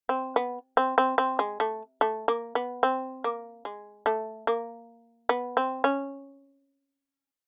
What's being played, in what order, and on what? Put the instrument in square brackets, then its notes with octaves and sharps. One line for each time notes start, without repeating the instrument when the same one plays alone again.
[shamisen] C4
B3
C4
C4
C4
G#3
A3
A3
A#3
B3
C4
A#3
G#3
A3
A#3
B3
C4
C#4